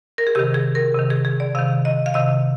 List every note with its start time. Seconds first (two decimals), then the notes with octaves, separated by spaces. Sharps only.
0.18 A#4
0.27 G#4
0.35 C3 D#3 G4
0.54 G#4
0.75 A#4
0.94 C3 D#3
1.10 G#4
1.25 G#4
1.40 D5
1.55 C3 D#3 F5
1.85 D#5
2.06 F5
2.14 C3 D#3 D#5